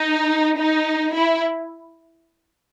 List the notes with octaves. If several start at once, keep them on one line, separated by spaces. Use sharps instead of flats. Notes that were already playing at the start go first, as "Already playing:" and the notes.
Already playing: D#4
D#4
E4